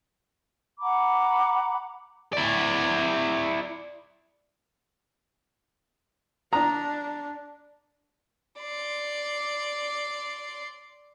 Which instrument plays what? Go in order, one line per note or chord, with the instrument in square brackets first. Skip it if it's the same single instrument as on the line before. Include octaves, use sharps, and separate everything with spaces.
[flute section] F#5 A#5 B5 D6
[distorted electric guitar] E4 D5
[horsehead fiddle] D4 [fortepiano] A#5
[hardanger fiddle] D5 C6